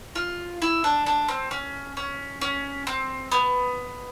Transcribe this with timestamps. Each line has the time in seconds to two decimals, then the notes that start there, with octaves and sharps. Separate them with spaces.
0.16 F4
0.62 E4
0.84 D4
1.06 D4
1.28 C4
1.51 C#4
1.97 C#4
2.41 C#4
2.87 C4
3.32 B3